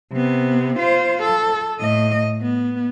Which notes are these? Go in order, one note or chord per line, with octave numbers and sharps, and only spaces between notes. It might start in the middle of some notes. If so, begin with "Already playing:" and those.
C3 B3
F4 C5
A4
A2 D#5
B3